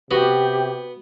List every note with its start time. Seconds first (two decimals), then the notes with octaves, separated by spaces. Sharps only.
0.11 C3 B3 F#4 G4